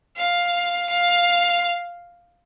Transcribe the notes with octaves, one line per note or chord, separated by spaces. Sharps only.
F5
F5